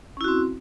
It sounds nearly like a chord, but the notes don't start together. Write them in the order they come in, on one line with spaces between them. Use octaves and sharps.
C#4 E4 F#4 C4